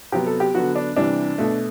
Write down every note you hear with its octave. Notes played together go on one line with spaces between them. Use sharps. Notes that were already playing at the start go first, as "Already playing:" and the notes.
C3 F#3 B3 G4
A4
G4
D3 F#3 B3 F#4
D4
C3 E3 G3 D4
B2 A3